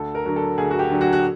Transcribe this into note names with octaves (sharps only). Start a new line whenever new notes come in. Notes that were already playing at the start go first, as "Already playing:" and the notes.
Already playing: D2 A4
A#4
D3 F#3
A4
D2 G#4
F#4
G4
D3 F#3
F#4
F#4